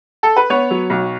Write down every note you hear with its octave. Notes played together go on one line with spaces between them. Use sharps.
A4
B4
B3 C#5
F#3
B1